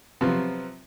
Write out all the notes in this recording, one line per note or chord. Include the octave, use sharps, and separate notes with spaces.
C3 F3 F#3 B3